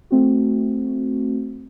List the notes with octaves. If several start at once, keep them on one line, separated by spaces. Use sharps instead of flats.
A3 C4 F#4